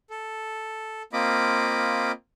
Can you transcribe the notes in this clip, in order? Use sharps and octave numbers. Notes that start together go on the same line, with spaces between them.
A4
A#3 C4 F4 D#5 B5 D6